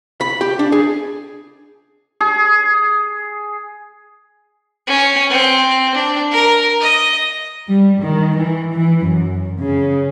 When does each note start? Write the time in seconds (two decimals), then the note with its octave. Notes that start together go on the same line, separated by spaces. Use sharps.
0.21 B5
0.41 G4
0.59 D4
0.72 G#4
2.21 G#4
4.87 C#4
5.29 C4
5.94 D4
6.31 A#4
6.80 D#5
7.68 G3
8.01 D#3
8.35 E3
8.70 E3
9.04 F#2
9.62 C#3